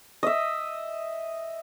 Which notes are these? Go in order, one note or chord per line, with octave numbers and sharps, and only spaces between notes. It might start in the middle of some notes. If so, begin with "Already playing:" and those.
D#5 E5